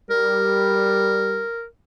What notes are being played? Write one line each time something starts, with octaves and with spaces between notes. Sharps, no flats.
G3 A#4